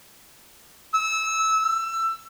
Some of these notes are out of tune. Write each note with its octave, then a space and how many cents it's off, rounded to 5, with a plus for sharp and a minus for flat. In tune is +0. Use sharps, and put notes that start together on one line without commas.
E6 -20
E6 +20